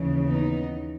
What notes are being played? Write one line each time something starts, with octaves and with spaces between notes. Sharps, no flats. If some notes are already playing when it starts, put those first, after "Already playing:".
Already playing: D#2 C#3 E3
B3 D#4